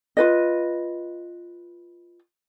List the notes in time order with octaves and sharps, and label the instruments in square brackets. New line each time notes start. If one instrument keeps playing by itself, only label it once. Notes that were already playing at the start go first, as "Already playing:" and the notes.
[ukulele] F4 B4 D#5